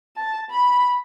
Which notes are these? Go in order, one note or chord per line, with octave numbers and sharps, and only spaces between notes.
A5
B5